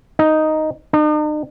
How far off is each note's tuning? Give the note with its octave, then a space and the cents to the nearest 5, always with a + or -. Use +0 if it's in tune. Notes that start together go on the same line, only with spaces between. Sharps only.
D#4 +0
D#4 -45